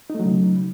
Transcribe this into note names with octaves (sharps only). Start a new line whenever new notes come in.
C#3 F#3 A3 D#4